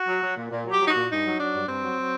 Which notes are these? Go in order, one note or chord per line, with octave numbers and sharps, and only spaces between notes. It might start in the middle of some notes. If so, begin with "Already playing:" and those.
Already playing: F#4
F#3
F#3
A#2
A#2
F#3 G4
F#3
D#4
F#4
A#2
G2 D#4
F#3
F#3 D4
G2
G2 C4
F#3
F#3